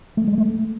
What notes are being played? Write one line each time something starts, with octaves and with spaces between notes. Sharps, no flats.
A3
G#3
A3